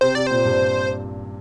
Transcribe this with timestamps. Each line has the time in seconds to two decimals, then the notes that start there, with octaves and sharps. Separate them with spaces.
0.01 C3 C5
0.15 C3 D5
0.27 A#2 C5
0.45 G2